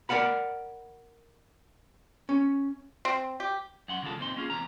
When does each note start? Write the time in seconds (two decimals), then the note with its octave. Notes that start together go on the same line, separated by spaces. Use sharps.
0.09 A#4 D5 F5 F#5 B5
2.29 C#4
3.05 C4
3.40 G4
3.88 F#2 F#5 C6
4.02 C#3 E3 G#3 F4 A4
4.18 F2 A#2 C4 D#4 C6
4.36 A#3 C#4 F4 G#4
4.50 E2 C3 E3 A#5